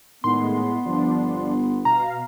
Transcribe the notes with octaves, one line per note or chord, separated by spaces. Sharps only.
A2 D#3 G#3 B3 C6
G1 F3 D4
B2 F5 A#5